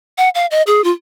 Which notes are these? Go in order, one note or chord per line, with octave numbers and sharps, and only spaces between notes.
F#5
F5
D#5
G#4
F4